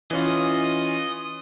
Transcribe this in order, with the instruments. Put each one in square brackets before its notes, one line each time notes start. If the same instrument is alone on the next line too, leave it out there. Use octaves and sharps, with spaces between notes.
[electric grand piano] E3 C#4 F4 [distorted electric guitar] D#5